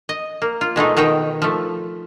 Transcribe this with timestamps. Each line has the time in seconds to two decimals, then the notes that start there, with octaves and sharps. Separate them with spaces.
0.09 D#5
0.42 A#3
0.61 F4
0.76 B2 G#3 A3 D#4
0.97 B2 D#3 D#4 G5
1.42 F3 A3